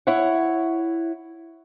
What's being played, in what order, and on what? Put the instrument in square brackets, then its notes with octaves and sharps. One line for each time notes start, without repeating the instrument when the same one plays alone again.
[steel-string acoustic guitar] E4 C#5 F#5